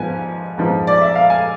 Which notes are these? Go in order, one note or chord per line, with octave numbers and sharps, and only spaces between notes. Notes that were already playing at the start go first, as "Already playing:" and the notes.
Already playing: G#2 F3 B3 G#5
G#2 F3 B3
D5
E5
F5
G#5